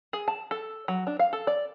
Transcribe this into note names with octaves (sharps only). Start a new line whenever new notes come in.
G#4
A5
A4
F#3
D4
F5
A4
D5